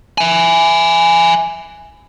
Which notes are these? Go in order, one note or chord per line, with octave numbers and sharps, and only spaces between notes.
E5 G#5